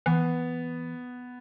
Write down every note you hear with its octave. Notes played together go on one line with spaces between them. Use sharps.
E3 B3